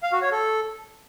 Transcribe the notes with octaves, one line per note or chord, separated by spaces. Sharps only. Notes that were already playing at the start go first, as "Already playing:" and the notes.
F5
F#4
C#5
A4